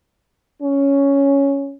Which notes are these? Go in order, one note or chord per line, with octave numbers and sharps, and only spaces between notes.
C#4